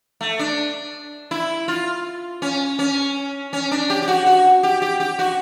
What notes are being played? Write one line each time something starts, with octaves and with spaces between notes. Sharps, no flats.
A3
D4
E4
F4
C#4
C#4
C#4
D4
G4
G4
F#4
F#4
G4
G4
G4
F#4